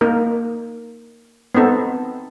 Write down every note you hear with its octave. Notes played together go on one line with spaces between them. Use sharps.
A#3 D#4 A#4
B3 C4 D#4 A4